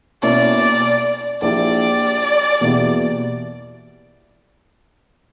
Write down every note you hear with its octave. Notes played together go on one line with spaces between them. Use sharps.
B2 A#3 C#4 E4 D5
A#1 A#2 A#3 E4 G4 D5
E2 B2 A#3 E4 G4